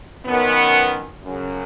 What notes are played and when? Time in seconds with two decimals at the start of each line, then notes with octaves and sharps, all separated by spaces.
0.24 F#2 D#3 B3
1.23 F#2 C#3